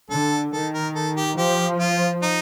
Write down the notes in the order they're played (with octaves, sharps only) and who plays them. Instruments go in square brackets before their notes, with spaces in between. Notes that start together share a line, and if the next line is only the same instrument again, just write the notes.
[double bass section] D3 [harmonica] A4
[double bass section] D#3 [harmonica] A4
[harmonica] A#4
A4
G4
[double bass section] F3 [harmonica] G4
[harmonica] F4
D#4